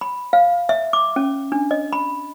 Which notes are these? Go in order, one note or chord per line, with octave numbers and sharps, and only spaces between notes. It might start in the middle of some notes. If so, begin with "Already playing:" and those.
B5
F5
E5
D6
C#4
D4
D#5
B5